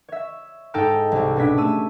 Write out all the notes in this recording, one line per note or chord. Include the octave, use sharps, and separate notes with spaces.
C#5 E5
G#2 D#4 A4 G5 A5 F6
C2
B2 C#4 D4 C#5 B6
A3 E6 D#7